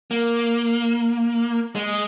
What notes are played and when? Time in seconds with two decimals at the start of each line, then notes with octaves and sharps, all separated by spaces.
0.11 A#3
1.75 G#3